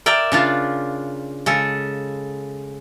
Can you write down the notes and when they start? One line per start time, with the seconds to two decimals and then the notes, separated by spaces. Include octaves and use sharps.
0.06 A#4 D5 E5 G5
0.32 C#3 D4 F4
1.46 C#3 G#3 A4